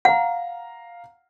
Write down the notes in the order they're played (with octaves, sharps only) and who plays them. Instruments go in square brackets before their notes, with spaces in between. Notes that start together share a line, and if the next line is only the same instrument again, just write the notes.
[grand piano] F5 A#5 [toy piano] F#5